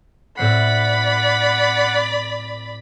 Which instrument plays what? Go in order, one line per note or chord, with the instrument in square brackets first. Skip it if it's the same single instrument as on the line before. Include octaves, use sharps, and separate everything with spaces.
[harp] A2 C4 C7 [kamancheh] D5 B5 [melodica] F#5